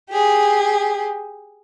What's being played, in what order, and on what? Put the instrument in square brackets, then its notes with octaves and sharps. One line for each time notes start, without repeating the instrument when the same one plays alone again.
[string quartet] G4 G#4